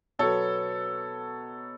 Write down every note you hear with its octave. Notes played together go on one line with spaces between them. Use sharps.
B2 F#3 B3 A4 C#5